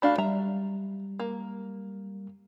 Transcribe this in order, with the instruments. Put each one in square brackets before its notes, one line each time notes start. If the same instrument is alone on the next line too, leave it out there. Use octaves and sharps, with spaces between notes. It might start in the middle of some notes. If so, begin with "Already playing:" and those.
[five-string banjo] A3 D4 F#4 [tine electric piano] F5 B5
[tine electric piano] G3 [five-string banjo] E5 A#5
[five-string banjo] A#3